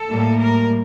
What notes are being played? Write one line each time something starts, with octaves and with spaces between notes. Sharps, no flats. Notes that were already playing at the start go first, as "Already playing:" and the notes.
Already playing: A4
A2 G3 A#3
A#4